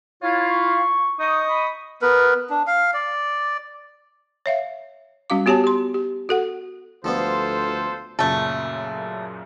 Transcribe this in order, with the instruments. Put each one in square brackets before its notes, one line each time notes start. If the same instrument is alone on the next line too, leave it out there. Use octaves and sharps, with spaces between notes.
[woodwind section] E4 F4 F5 [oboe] C#5
[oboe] C#6
[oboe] D#4 [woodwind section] D#5 C#6 D#6
[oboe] B5
[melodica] B3 A#4 B4
D4
F5
D5
[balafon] C#5 E5 F5
G3 C#4 F#4 F5 D6
B3 F#4 G4 C#5 G#5 A5
G4 C6
G4
F#4 A4 F#5
[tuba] D2 [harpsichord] F3 G3 B3 [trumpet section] F4 A4 [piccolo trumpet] C5
[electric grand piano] F#2 A#2 C#3 [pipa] A3 A4